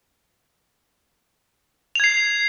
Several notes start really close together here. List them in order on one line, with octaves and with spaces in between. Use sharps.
F7 G#6 C7